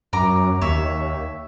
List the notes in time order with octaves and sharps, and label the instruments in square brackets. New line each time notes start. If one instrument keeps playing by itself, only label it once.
[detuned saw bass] F#2 [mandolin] A#5 D6
[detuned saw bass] D#2 [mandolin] C#5 E5